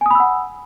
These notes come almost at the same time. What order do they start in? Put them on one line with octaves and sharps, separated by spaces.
G#5 D#6 B5 E6 F#5